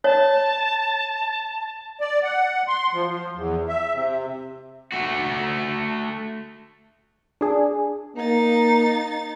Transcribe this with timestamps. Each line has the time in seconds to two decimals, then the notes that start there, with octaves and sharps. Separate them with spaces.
0.04 C#5 A5
2.00 D5
2.23 F#5
2.68 C6
2.93 F3
3.07 F3
3.36 E2
3.69 E5
3.93 C3
4.92 A3 F#4
7.41 D4 G#4
8.16 A#3 D#4 A6